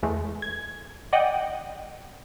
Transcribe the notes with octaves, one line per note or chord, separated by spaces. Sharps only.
E2 E3 G#3 A3
G#6
D5 D#5 F#5 G5